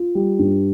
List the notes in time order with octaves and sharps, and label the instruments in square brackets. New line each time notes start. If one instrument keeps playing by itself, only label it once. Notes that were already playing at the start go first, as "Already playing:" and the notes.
Already playing: [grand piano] F4
G3
G2